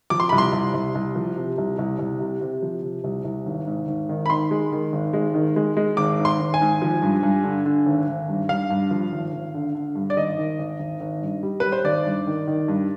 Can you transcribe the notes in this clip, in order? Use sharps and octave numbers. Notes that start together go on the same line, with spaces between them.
F3 D6
C6
C2 B5
C6
C2
C2
C2
F3
C3
C2
C2
C2
C3
C3
F3
C3
C2
C2
G#1
G#2
G#1
D#3
B5
D#3 C6
G#3
D#3
G#1
G#3
D#3
G#3
G#3
G#1 D6
G#2
C6
G#1
G#5
G#2
F3
G2
G2
D3
D3
G#1
G#1
G2
G2 F5
G2
F3
G#1
G#1
D3
D3
G2
D5
G#1 D#5
D#3
G#1
G#1
G#1
G2
G3
G3 B4
C5
G#1 D5
G2
D#3
D#3
G2